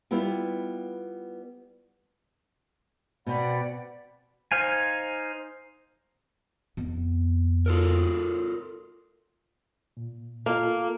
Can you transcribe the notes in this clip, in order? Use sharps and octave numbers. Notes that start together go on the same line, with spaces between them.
G3 B3 E4 F4 G4
B2 C4 D5 F#5 B5
D#4 C5 F5 G#5
F2 B3
F4 A4 A#4
A#2
A#3 F4 A4